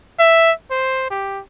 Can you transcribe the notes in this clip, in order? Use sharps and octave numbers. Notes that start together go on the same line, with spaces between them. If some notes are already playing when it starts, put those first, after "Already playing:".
E5
C5
G4